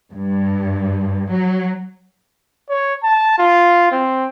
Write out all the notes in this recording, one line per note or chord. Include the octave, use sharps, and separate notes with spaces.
G2
F#3
C#5
A5
F4
C4